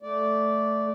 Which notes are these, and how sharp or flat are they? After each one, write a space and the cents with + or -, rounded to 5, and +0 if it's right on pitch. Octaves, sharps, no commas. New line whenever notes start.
A3 -5 D5 -10